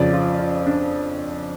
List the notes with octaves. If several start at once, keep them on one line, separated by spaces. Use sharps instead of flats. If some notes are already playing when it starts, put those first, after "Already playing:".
Already playing: F2 C#3 F3 D5
F4
F4
D4